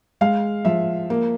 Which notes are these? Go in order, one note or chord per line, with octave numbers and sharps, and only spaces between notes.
G#3 F5
F3 E5
A#3